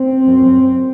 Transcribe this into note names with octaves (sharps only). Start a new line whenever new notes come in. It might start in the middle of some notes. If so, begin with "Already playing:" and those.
Already playing: C4
F#2